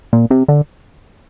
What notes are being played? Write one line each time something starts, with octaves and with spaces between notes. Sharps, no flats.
A#2
C3
D3